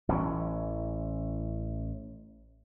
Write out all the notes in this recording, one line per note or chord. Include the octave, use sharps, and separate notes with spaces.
A1 E3 A#3 C#4